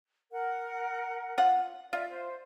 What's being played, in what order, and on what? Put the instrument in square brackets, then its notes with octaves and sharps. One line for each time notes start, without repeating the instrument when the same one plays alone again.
[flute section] A#4 F#5
[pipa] F4 F#5
[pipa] F4 [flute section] D5 E5
[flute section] C5